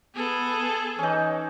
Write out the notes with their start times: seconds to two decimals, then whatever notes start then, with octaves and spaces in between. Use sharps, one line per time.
0.15 B3 G#4 A4
0.99 E3 C#4 D#4 C#5